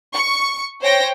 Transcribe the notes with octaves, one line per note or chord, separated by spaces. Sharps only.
C#6
C5 C#5 G5 A#6